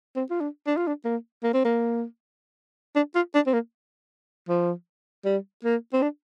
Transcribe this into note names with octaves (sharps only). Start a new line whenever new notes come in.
C4
F4
D4
D4
F4
D4
A#3
A#3
C4
A#3
D4
F4
D4
C4
A#3
F3
G3
A#3
C4
D4